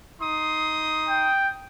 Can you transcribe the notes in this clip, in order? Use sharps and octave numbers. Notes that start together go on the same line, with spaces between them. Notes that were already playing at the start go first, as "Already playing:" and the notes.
D#4 C6 D#6
G5